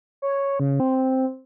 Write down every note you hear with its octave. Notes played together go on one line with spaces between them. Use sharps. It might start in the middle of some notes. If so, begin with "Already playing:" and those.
C#5
C#3
C4